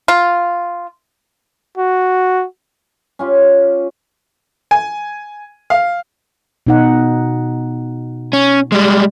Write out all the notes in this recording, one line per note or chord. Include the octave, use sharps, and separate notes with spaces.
F4
F#4
C#4 F4 G4
G#5
F5
B2 D#4 F#5
C#4
G3 G#3